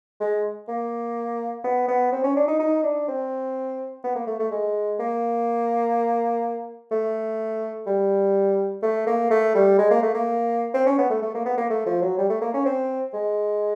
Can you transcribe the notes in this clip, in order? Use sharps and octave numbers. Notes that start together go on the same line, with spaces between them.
G#3
A#3
B3
B3
C4
C#4
D4
D#4
D#4
D4
C4
B3
A#3
A3
A3
G#3
A#3
A3
G3
A3
A#3
A3
G3
G#3
A#3
A3
A#3
C4
C#4
B3
A3
A3
A#3
B3
A#3
A3
F3
F#3
G3
A3
A#3
C#4
C4
G#3